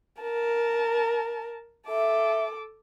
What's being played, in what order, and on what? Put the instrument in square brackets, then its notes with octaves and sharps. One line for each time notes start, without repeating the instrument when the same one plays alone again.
[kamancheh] A#4 A5
[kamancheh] A4 D6 [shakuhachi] E5